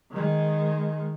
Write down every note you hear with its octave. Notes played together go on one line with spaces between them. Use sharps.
D#3 G#3